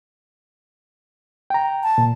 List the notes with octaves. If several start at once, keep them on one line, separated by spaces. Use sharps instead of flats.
G5 A#5
A5
A#2